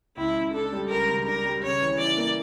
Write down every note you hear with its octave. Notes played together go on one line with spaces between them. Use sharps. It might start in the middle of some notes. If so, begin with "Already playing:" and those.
C#2 E4
C#3
D4 A4
G3
C#2 A#4
C#3
D4 A#4
G3
C#3 C#5
E3
E4 D5
A#3